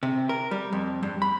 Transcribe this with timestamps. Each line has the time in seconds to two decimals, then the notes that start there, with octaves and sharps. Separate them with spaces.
0.03 C3
0.29 A#4
0.51 G3
0.73 F2
1.03 G2
1.22 B5